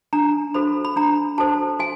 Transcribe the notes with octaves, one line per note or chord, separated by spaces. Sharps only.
D4 A#5
F#4 A4 C5 B5
B5
D4 A#5
F#4 A4 C5 A5
F#4 G#5